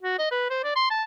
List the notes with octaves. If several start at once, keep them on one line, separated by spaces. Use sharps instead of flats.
F#4
D#5
B4
C5
D5
C6
A5